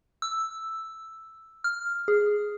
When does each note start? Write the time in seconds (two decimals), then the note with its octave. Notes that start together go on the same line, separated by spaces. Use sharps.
0.22 E6
1.64 F6
2.08 G#4